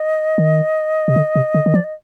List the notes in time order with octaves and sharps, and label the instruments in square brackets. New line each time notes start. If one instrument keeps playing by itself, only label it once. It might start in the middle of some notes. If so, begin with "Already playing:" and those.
Already playing: [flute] D#5
[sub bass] D#3
C3
D3
C3
D3
D#3
[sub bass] F3 [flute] D5
[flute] D#5